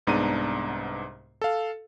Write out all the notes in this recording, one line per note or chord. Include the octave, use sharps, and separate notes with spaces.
C2 G#2 B3 D4 A#5 D#7
A4 F5